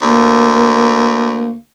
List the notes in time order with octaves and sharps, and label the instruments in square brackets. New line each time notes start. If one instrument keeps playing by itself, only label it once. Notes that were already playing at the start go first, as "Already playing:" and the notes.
[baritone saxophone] D2 [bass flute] A#3